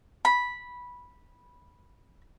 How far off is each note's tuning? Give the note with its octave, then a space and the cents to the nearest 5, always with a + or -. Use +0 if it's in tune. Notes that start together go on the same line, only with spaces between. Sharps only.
B5 -10